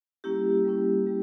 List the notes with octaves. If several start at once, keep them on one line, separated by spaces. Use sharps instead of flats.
G3 A#3 C#4 E4 G4
G3 A#3 C#4 E4
G3 A#3 C#4 E4